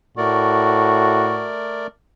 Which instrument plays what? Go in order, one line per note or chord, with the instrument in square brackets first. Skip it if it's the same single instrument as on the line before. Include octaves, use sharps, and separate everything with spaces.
[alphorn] A2 [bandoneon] A3 A#4 D5 [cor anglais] F#4